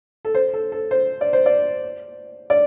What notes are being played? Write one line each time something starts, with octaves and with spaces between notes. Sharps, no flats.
A4
C5
A4
A4
C5
D5
C5
D5
D5